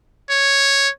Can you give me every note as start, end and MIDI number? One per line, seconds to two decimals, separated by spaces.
0.30 0.89 73